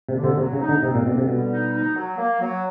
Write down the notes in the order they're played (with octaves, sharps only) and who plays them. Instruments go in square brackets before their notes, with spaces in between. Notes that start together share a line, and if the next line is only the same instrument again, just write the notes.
[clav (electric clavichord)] C3
[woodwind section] D3
[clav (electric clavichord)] C3
[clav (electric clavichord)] C3 [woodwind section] F#3
[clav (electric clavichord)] C#3
[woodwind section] D#4
[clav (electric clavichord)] D3
[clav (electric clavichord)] C3 [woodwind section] C4
[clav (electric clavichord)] A#2
[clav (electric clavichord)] B2 [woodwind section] D3
[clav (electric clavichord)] C3
[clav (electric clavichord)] B2 [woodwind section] G3
[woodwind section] D#4
D#4
F#3
A#3
F#3